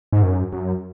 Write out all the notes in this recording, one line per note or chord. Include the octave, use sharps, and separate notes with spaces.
G#2
F#2
F#2